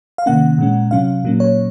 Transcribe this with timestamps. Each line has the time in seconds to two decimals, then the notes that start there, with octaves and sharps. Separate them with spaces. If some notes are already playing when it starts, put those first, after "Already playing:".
0.18 F5
0.26 C3 D#3 A#3 C#4 F#5
0.58 A#2 G#3 C#4
0.91 C3 F#3 C#4 F5
1.24 A#2 F#3 A#3 C#4
1.40 C#5